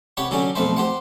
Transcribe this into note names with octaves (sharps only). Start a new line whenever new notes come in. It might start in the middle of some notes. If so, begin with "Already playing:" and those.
C2 G4 B4 C#5 F#5
D3 F#3 G3 C#4
B1 F2 A3 B4 C5
G4 C5 F#5